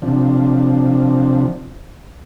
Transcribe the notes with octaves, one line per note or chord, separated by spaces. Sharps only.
C3 F3 D4